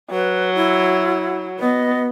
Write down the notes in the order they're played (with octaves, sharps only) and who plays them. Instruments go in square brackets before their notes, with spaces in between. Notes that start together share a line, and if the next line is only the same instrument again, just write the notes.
[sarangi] F#3 [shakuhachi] B4
[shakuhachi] E4
[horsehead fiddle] B3 [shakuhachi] D#5